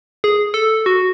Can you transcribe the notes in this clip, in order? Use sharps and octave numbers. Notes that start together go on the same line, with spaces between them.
G#4
A4
F#4